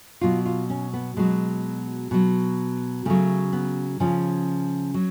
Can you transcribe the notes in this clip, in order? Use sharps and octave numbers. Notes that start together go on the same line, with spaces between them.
B2 F#3 F4
F4
C#4
B3
B2 F#3 G#3
B2 F#3
C#3 F#3 A3
B3
C#3 F3 C#4
F#3